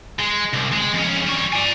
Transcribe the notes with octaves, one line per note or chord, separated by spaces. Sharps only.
G#3
C2
G#3
F2 C#4
G3 C#5
D5 G#5